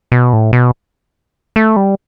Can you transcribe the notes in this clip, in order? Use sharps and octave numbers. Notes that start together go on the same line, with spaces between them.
B2
A2
B2
A3
G3